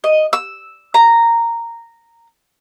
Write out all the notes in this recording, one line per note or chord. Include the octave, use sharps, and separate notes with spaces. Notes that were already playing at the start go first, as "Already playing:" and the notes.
D#5
E6
A#5